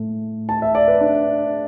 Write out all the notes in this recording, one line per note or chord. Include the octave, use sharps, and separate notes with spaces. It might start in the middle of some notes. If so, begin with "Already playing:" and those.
Already playing: A2 A3
A5
E5
D5
B4
D4